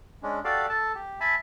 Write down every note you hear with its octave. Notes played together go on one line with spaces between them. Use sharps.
G#3 C#4 D4
F#4 G4 A4 D5 F5
A4 A5
G4
E5 G#5 A5 B5